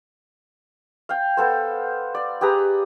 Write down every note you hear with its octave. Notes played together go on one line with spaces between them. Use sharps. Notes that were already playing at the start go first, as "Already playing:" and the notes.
F5 G5
B3 A4 C5
D5
G4 G#4 B4 A#5